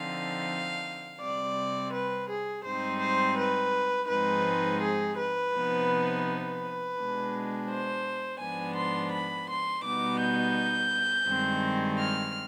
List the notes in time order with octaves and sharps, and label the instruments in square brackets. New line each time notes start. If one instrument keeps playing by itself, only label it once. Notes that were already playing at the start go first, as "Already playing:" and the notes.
Already playing: [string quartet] D3 F3 C4 D#4 F5
C3 G3 C4 D5
B4
G#4
G#2 G3 C4 D#4 C5
C5
B4
G#2 F3 G#3 C4 D#4 B4
G#4
B4
C3 F3 B3 D#4
B4
B2 G#3 D4
C5
G#2 F3 B3 D4 G#5
C6
B5
C6
B2 G3 B3 D#4 D6
G6
G2 D#3 G#3 C4
F6